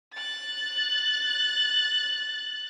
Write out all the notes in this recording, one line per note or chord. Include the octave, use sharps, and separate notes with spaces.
F#6 A6